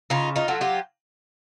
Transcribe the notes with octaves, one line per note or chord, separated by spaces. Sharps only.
C#3 D#4 F4
D#4 F4
F#3 A3
F4 G4